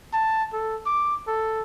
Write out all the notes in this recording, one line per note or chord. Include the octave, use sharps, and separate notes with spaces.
A5
A4
D6
A4